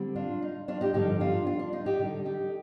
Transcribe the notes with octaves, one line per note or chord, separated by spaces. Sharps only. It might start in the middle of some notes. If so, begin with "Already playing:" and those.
Already playing: D3 G3 C4
D4 F4
D#4
D4 F4
D#4 G4
G2 D3 F3 D#4 G4
D4 F4
D4 F4
D4
D#4
D#4 G4
D3 G3 D4
D#4 G4